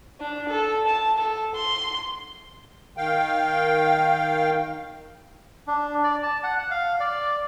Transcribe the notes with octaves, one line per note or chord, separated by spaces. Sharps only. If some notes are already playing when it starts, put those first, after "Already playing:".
D4
A4
A5
A4
C6
D#3 F5 G5
D4
D5
A5
F#5
F#5
F5
D5